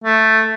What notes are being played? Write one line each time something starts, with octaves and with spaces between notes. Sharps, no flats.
A3